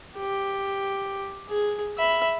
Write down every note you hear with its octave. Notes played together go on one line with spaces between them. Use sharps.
G4
G#4
E5 B5